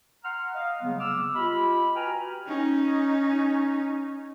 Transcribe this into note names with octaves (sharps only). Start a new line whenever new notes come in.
F#5 A#5 C6 F6
D#5 F5
C#3 F#3 G3 A#3 B3
D6 E6 F6
F4 G4 D#5 B5
F#4 B4 G5 G#5 A#5 F6
C#4 D#4